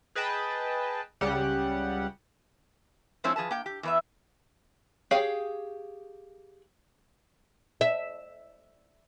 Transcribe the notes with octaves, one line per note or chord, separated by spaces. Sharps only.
G#4 B4 D#5 G5 A5
C#2 C#3 G3 G4 F#5
F3 G#3 C4 E4 C5 C#5
F3 G#4 B4 A5
A#3 G5
G4
E2 B4 E5
G4 G#4 C#5 F5
E5